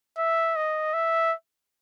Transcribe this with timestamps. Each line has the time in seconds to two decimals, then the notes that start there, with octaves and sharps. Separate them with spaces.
0.18 E5
0.56 D#5
0.94 E5